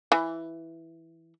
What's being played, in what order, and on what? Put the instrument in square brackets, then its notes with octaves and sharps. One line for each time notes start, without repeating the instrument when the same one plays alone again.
[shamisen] E3